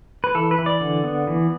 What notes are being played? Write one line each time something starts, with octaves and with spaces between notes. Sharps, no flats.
B4
E3 A4
B4
E3
D5
D3
B3
E3